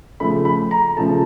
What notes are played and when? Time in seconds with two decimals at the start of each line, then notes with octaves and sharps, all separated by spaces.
0.20 C#3 F3 A3 B5
0.45 B5
0.71 A#5
0.97 C#3 F3 A3 A5